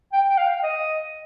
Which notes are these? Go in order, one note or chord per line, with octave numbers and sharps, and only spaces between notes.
G5
G5
F5
D#5